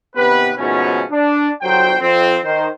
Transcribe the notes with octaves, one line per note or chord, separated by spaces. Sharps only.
D#2 C3 B3 G4 B4
D#2 G#2 B2 F3 A3 C#4
D4
G1 F#3 C5 G5
F2 C4
D#3 C5